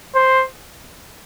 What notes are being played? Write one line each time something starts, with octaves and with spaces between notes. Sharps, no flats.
C5